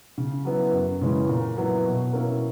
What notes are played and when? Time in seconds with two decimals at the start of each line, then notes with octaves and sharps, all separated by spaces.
0.18 C#3
0.45 F#3 B3 E4
0.73 F#2
1.01 C#3 E3 G#3 C#4
1.29 A#2
1.57 F#3 B3 E4
1.86 B2
2.13 A#3 C#4 E4